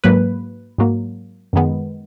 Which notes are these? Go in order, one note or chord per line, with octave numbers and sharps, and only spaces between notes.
G#2 F#3 A#3 B4
G#2 F#3 A#3
F#2 D#3 G#3 B3